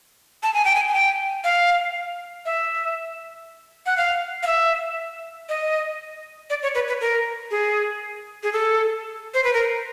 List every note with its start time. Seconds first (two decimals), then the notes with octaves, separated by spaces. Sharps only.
0.43 A5
0.54 G#5
0.65 G5
0.75 G#5
0.88 G#5
0.94 G5
1.44 F5
2.45 E5
3.86 F#5
3.97 F5
4.43 F5
4.47 E5
5.49 D#5
6.50 D5
6.63 C#5
6.75 B4
6.88 B4
7.01 A#4
7.51 G#4
8.43 G#4
8.53 A4
9.34 C5
9.44 B4
9.53 A#4